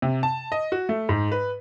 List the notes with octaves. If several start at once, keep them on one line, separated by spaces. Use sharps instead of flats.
C3
A5
D#5
F#4
A3
G#2
B4